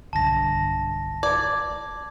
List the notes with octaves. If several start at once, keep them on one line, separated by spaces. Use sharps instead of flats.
B1 G2 D3 A5 A#6
D5 G#6